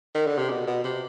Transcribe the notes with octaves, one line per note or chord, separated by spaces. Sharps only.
D#3
D3
C3
B2
B2
C3